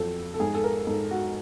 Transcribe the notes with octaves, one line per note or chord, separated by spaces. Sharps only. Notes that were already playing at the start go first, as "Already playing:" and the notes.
Already playing: F2 F#3 A4
A4
G#2 G#4
A4
A#4
G#2 A4
F#4